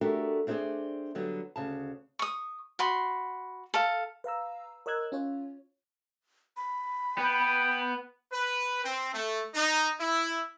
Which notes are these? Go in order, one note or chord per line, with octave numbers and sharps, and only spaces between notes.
A3 D4 F#4 G4 A4 A#4
A3 C4 D4 G4 G#4 D5
D3 F#3 G3 B3
D2 C#3 A5
C#6 D#6
F#4 B5 C6
A4 F5
B4 F5 A#5 E6
A#4 C#5 D#5 E6 F#6 G#6
C#4 F4 C#5
B5
B3 G5
B4
C4
A3
D#4
E4